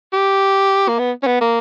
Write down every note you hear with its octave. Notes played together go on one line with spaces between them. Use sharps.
G4
A#3
B3
C#4
B3
A#3